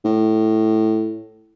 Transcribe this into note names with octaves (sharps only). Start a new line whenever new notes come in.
A2